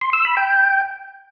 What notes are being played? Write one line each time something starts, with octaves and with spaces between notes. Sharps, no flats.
C6
E6
B5
G5